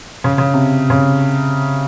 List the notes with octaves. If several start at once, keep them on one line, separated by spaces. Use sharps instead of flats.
C#3
C#3
C3
C#3